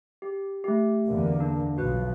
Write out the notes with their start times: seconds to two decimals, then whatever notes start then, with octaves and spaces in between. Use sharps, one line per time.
0.22 G4
0.64 A3 G4
1.07 E2 D3 A#3
1.40 D4
1.78 B1 F3 F#4 B4